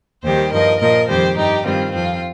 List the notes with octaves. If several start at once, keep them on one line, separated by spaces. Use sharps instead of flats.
D#2 D#3 G3 G4 C5
G2 F3 A#4 D#5
A#2 F3 A#4 D#5
F2 D#3 G3 G4 C5
G2 G3 D#4 G4
G2 D#3 G3 C4 F4
F2 F3 C4 F4